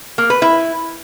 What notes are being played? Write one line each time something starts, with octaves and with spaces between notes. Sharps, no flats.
A#3
B4
E4